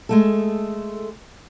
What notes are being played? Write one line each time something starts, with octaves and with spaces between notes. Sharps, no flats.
G#3 A3 A4